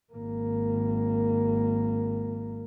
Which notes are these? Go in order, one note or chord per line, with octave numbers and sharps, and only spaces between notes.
G#1 A#3